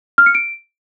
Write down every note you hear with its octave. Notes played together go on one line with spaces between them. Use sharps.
F6
C#7
D7